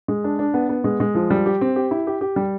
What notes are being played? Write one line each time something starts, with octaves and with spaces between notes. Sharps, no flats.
G#3
D4
D4
B3
B3
G#3
G#3
F3
G3
G4
C4
G4
E4
G4
G4
G3